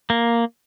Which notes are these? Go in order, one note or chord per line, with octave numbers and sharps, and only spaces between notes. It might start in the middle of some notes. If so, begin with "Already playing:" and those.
A#3